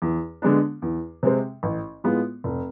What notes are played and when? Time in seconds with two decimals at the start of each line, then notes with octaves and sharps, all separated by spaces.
0.02 E2
0.42 D3 G#3 B3 D4
0.82 E2
1.23 C3 G#3 C4
1.63 A1
2.04 A2 G#3 B3 F4
2.44 F1